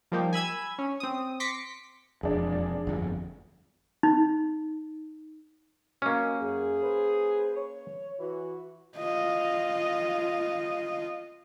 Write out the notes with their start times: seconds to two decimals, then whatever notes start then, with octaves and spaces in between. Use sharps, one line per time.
0.12 F3 G3 A#3 D#4 G4
0.33 G#5 B5 E6 G#6
0.79 C#4
1.00 C4 D#6
1.40 C6 D6 A#6 B6 C#7
2.23 E1 F2 D4 G#4
2.87 G1 F2
4.03 D#4
6.02 F#3 A#3 C#4 D#5
6.40 F#2 G#4
6.82 B4 C5
7.55 C#5
8.19 E3 F#4
8.97 F4 D#5